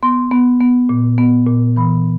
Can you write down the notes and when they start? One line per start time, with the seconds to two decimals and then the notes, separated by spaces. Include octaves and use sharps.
0.03 B3 C6
0.32 B3
0.60 B3
0.89 A#2
1.18 B3
1.47 A#2
1.76 E3 B5